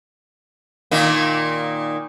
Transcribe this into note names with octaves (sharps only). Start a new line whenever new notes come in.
A#2 D#3 A#3